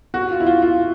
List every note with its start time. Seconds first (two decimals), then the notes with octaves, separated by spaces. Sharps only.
0.14 F#4
0.31 F4
0.40 E4
0.46 F4
0.62 F4